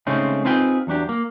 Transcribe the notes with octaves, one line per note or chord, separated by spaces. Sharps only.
C#3 G#3 A3 C4 C#4 D#4
C4 D#4 F4 G#4 B4 G5
E2 F#3 D4 G4
A#3